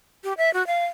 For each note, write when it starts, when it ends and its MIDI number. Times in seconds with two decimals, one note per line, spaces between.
0.24 0.33 67
0.38 0.53 76
0.54 0.65 66
0.67 0.85 77